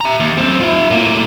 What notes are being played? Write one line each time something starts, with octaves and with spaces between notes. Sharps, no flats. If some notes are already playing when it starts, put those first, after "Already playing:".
E5 A#5
D#2
F#2 C4
F4 E5
A2 A#3